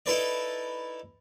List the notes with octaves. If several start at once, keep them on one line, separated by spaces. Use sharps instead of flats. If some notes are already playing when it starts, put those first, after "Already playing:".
D#4 E4 A4 B4 D5 D#5